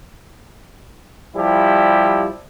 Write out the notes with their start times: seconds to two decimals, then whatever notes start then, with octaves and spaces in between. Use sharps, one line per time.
1.35 F3 G3 E4 G4